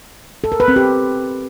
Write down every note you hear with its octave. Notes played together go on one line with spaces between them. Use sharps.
A4
A#4
B4
C4
G4